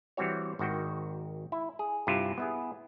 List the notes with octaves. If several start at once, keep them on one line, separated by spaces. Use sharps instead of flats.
E3 G3 C4 F#4 C#5
G#1 D#3 F#4 G5
E4
G#4
G2 C3 E4 F4
B3 E4 G#4